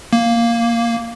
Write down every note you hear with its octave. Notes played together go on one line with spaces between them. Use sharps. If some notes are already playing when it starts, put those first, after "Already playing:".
A#3